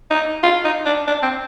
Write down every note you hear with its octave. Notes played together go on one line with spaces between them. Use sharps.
D#4
F4
D#4
D4
D4
C4